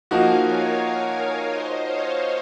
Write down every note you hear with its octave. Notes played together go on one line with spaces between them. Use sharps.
F3 A#3 D#4 F#4 F5 G#5
A#4 C#5
A#4 C#5
C5 D#5
C#5 F5